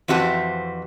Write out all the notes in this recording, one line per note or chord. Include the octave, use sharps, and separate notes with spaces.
F2 E3 C4 F#4 G4 A5